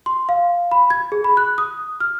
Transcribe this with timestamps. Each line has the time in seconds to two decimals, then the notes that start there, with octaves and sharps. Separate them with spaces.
0.06 C6
0.29 F5
0.71 B5
0.90 G#6
1.12 G#4
1.24 B5
1.37 F#6
1.58 D#6
2.00 F6